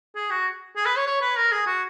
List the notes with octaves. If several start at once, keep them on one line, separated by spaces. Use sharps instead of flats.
G#4
F#4
G#4
B4
C#5
C#5
B4
A#4
G#4
F#4